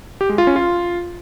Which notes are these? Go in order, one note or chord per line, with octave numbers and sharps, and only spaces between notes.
G4
G#3
F4
C#4
F4